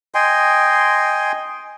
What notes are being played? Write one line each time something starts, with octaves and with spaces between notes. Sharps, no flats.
D#5 G5 G#5 C6